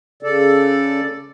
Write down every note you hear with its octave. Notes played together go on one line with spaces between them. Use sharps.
C#3 A4 D5